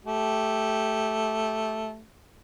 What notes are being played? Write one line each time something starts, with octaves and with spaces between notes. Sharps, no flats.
A3 G4